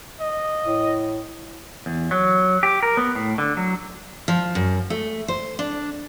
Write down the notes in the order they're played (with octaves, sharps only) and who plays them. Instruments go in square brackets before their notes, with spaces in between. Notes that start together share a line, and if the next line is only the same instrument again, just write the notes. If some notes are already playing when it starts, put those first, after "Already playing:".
[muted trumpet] D#5
[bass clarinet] A2
[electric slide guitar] E2
F#3
G4
A#4
B3
A2
D3
F#3
[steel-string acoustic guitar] F3
F#2
A3
C5
D4